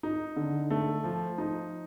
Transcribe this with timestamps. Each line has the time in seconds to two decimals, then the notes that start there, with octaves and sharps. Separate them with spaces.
0.03 D#4
0.36 D3
0.70 A3
1.04 F3
1.38 D#4